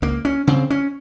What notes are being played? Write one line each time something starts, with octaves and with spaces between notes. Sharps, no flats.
C#2 A#3
C#4
C#3 C4
C#4